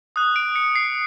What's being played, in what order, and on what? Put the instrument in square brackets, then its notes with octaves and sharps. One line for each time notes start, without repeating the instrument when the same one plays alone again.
[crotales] D#6 F#6
D7
C#7
C7